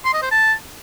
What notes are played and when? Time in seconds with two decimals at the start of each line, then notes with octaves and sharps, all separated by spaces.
0.05 C6
0.14 D#5
0.22 C5
0.31 A5